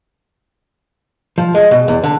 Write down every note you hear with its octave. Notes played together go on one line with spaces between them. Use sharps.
F3
G#3
B2
E2
D3